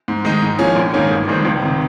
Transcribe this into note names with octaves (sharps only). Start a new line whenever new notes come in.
G#2
D#3 G#3 D#4
G#2
F3 A#3 C#4 G#4
A#1
G#2 D#3 A#3 C#4
G1
G2 D#3 G#3 C4
C#2
C3 D#3